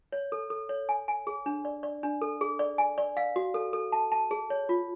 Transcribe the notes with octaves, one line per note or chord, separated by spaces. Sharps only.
C#5
A4
A4
C#5
G#5
G#5
G#4
D4
D5
D5
D4
A4
G#4
D5
G#5
D5
F5
F#4
A4
A4
A5
A5
G#4
C#5
F4